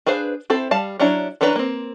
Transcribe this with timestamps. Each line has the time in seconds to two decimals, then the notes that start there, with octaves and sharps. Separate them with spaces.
0.06 D4 G#4 B4 C5 F5
0.50 C4 E4 A4 C5
0.71 G3 F5 A5
0.99 F#3 C#4 D4 E4 A#5
1.41 E3 C#4 D4 B4 A#5
1.56 A#3 C4